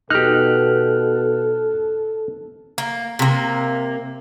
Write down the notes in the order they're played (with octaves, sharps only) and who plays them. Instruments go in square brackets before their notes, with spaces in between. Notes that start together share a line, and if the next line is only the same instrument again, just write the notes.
[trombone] B2 [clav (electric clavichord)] D#4 G4 [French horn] A4 [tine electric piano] F6 F#6
[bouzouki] A#3
C3 A#3